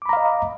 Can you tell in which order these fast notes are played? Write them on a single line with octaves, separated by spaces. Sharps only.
D6 B5 A#5 F5 D#5